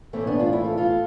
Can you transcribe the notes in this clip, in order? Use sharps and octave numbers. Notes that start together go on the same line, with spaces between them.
A2 E3 A3 C4
B3 D4
D4 F4
C4 E4
F4 A4
F4 A4